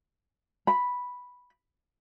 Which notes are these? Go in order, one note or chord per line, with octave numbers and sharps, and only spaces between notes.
B5